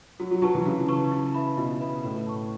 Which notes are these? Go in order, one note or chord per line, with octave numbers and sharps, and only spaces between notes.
F#3 F#4
F#3
F#3 B4 A5 C#6
E3
C#3 F#4
B4 A5 C#6
E4
B4 E5 B5
B2 E4
B4 E5 B5
A2 B4
A5 C#6